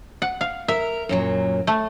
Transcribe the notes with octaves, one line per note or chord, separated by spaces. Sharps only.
F#5
F5
A#4 E5
F#2 A#2 F#3
A3